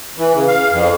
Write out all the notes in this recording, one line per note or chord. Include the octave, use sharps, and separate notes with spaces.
E3
C#3
F5
F2